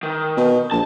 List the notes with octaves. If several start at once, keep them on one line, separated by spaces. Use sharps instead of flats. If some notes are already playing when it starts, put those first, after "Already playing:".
D#3
B2
A#1 A5